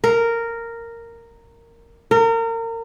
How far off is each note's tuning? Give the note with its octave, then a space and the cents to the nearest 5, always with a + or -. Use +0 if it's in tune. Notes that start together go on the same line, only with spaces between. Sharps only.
A#4 -10
A#4 -30